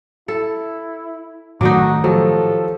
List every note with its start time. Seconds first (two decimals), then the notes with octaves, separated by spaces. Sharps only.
0.28 E4 A4
1.61 A2 D#3 F#3 A3 D4 D#4 F#4 D6
2.04 F3 F#3 G4 A4 C5